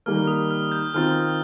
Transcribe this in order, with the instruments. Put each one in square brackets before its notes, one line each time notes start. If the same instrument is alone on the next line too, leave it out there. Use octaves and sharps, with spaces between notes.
[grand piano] D#3 G3 A#3 [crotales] F6
[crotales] D#6
F6
G6
[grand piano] D#3 C4 F4 [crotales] F6